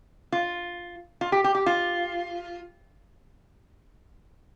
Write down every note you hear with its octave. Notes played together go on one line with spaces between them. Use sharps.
F4
F4
G4
G4
G4
F4